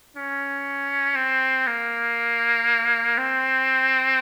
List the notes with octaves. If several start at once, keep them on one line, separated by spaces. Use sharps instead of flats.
C#4
C4
A#3
C4